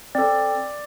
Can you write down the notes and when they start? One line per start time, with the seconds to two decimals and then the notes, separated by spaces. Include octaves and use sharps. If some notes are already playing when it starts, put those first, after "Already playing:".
0.15 C4 A4 D5